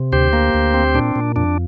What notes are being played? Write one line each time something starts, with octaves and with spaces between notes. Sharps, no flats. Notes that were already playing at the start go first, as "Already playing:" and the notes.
Already playing: C3
D2 G4 C5
A#3
D2
C4
A#2 D4
A#2
F2 D4